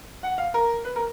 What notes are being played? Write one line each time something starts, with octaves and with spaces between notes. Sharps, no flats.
F#5
F5
A#4
B4
A#4